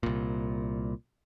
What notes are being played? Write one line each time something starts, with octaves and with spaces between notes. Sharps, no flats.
C2 A#2